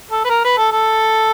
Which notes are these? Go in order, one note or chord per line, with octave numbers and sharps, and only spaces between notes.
A4
B4
A#4
B4
A4
A4